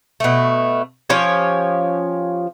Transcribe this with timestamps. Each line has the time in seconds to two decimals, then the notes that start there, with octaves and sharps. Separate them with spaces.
0.20 B2 A3
1.10 F3 C#4 G4 C#5